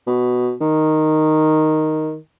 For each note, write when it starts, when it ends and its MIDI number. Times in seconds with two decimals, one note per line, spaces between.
0.07 0.53 47
0.61 2.16 51